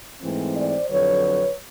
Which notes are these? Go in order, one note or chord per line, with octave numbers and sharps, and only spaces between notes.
G#2 E3 A3 C4
C5 D5
F2 D3 F#3 B4 C#5